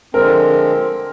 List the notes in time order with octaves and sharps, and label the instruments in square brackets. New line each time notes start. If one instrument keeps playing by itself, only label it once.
[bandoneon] D3 F3 G#3 C4 [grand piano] A#4